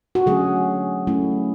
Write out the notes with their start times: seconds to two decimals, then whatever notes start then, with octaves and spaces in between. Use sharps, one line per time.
0.15 F#4
0.26 D3 F#3 A3 C#4 G#4
1.07 F#3 A3 C#4 E4